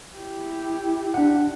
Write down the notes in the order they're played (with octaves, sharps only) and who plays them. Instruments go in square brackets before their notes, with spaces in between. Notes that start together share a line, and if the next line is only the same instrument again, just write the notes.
[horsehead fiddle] E4 G4
[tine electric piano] D4 F#5